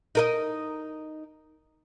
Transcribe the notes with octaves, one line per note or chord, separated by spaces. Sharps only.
D#4 A#4 D#5